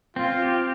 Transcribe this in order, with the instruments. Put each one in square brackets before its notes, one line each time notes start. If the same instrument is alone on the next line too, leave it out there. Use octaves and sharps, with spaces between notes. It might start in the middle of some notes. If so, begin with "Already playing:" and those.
[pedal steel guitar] C4 [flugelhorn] F4
[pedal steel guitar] G4